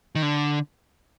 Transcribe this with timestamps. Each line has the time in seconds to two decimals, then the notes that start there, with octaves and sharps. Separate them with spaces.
0.15 D#3
0.22 D3